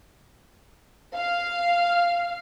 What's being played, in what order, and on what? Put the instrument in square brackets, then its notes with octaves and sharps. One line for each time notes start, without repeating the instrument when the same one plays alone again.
[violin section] F5